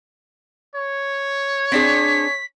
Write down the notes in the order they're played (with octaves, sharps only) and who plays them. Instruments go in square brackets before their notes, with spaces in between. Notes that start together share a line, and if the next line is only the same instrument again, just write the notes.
[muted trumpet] C#5
[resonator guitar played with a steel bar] C4 D4 G#4 [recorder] B6